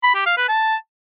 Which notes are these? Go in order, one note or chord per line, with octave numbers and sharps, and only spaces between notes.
B5
G4
F5
B4
A5